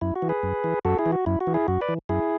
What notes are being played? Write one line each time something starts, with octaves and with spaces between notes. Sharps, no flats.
F#2 E4
F#4
E3
G#4 B4
F#2
E3
F#2 F#4 A4
E4 G#4
E3
F#4
F#2 E4
F#4
E3
E4 G#4
F#2 F#4
B4 D5
E3
F#2 E4 G#4